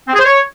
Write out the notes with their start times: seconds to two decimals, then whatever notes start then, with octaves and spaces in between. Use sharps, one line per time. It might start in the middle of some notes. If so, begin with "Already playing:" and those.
0.07 C4
0.13 G#4
0.18 C5
0.24 C#5